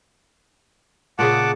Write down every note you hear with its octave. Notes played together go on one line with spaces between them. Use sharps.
A#2 C#3 G#4 F#5 A5 D6